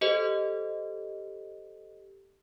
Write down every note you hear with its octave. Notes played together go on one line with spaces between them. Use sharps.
G4 A4 C5 D#5